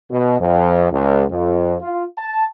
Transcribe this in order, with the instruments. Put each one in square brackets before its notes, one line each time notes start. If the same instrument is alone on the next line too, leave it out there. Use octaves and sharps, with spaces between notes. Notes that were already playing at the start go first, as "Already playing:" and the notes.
[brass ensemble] B2
F2
C#2
F2
F4
A5